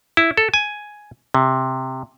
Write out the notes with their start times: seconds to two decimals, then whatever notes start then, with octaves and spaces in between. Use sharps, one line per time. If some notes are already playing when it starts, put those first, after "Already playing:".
0.17 E4
0.37 A4
0.54 G#5
1.34 C3